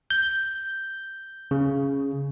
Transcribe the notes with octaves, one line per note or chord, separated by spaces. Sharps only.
G6
C#3